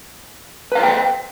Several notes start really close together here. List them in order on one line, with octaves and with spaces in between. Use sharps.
B4 F5 C5 G5